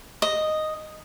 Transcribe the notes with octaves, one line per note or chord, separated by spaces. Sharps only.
D#5